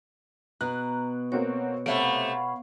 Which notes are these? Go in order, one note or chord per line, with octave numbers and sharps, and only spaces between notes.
B2 A#5 F#6
A#3 C4 F#4 C#5
C3 A3 C#5 F5 F#5 B5 C#6 D7